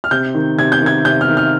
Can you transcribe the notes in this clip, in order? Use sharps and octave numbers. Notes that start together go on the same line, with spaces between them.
F6
C3 G6
D#3
C3 G#6
G6
D#3 G#6
C3 G6
F6
D#3
F6